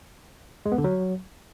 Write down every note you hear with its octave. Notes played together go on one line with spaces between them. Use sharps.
G#3
B3
D3
F#3